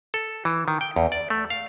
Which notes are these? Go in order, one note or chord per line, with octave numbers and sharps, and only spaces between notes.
A4
E3
D#3
G5
E2
D5
A3
F5